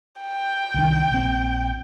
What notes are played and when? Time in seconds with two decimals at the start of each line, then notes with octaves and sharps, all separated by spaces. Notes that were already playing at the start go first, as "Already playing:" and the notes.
0.22 G5
0.74 C2 D#3 D4
1.11 A#1 C4